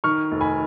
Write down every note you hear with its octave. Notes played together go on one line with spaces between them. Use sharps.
D#3 C#6 F6
F1
G#5 B5